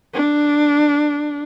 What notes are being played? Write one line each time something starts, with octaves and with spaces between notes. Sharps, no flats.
D4